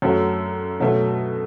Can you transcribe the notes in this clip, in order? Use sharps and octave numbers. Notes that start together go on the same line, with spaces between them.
F#2 F#3 A3
B2 F#3 A3